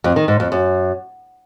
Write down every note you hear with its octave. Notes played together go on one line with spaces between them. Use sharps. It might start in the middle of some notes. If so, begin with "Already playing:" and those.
F2
D#3
G#2
F2
F#2